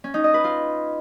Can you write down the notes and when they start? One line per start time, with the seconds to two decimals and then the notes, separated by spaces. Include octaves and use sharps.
0.04 C#4
0.14 D#4
0.24 D#5
0.34 B4
0.44 F4